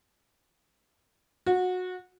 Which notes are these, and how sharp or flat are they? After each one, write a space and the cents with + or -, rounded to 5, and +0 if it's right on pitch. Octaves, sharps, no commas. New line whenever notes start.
F#4 -20